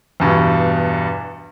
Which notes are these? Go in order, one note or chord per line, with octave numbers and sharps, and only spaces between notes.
E2 G2 B2